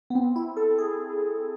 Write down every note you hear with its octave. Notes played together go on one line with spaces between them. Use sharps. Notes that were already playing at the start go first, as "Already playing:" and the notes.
B3
C4
E4
A4
G#4